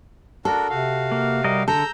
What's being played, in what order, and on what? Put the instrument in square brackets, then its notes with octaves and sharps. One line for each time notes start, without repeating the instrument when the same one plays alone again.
[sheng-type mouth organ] D4 F#4 A#4 [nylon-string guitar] A4
[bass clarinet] C3 [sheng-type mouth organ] F#4 F5
[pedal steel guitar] A#3
G3 A#4 D#5
[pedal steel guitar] D3 [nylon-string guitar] A4 [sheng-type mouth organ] A#5 E6 G6